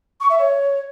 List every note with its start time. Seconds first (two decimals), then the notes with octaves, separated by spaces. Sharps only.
0.21 C#6
0.30 E5
0.39 C#5